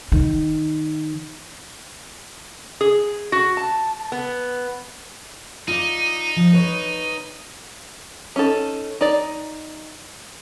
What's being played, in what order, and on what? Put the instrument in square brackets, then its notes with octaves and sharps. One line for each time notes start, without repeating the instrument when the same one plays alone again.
[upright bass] D#3
[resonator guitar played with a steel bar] G#4
F#4
A5
B3
[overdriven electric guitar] D#4 [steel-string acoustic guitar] F4 D5
[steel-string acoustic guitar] F3
B4 C#5
[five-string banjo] C#4 D#4 A4
D#4 D5